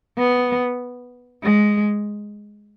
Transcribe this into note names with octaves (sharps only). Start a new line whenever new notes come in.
B3
G#3